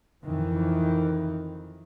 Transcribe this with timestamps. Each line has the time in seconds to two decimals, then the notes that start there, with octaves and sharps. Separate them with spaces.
0.23 F2 D#3 E3